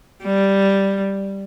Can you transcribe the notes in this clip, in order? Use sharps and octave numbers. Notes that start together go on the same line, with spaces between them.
G3